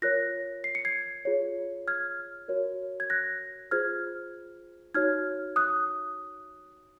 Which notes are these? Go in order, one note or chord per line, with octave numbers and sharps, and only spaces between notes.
F4 A#4 C#5 F#6 A#6
C7
C#7
G#6 C7
F4 G#4 C#5
F6 G#6
F#4 A#4 C#5
G#6
F#6 A#6
F4 G#4 C5 F6 G#6
D#4 F#4 C#5 F6 G#6
D#6 F#6